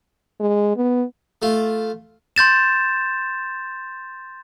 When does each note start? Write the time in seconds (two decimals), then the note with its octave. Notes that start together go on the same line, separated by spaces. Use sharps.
0.40 G#3
0.77 B3
1.42 A3 F4
2.36 C6 G6 A6 E7